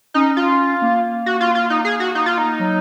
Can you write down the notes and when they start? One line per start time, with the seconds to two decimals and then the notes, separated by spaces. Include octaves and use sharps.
0.14 C#4 D#4
0.37 F4
0.82 A#3
1.26 F#4
1.40 F4
1.55 F4
1.70 D#4
1.85 G#4
2.00 F#4
2.15 D#4
2.26 F4
2.38 D#4
2.59 F#3